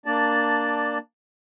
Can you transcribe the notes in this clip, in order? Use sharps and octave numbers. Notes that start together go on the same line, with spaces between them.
A#3 D4 D5 A5